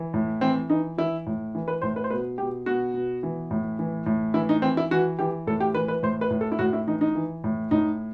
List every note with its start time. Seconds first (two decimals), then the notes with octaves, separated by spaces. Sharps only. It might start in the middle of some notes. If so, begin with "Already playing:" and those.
Already playing: E3
0.14 A2
0.41 E3 C4
0.70 E3 D#4
0.98 E3 E4
1.26 A2
1.55 E3
1.68 B4
1.82 A2 C5
1.96 B4
2.04 C5
2.10 B2 B4
2.38 B2 G4
2.66 B2 F#4
2.94 B2
3.23 E3
3.51 A2
3.79 E3
4.06 A2
4.34 E3 E4
4.49 D#4
4.62 E3 C4
4.77 E4
4.91 E3 F#4
5.19 E3 G4
5.47 A2 A4
5.60 G4
5.74 E3 B4
5.88 B4
6.03 A2 C5
6.21 B4
6.30 A2
6.41 A4
6.52 E4
6.59 A2 F#4
6.73 E4
6.87 E3 D#4
7.01 D#4
7.15 E3
7.44 A2
7.71 A2 D#4